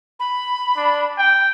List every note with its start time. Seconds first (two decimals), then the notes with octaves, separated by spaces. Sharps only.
0.20 B5
0.76 D4
1.18 G5